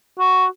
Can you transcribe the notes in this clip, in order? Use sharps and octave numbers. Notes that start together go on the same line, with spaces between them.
F#4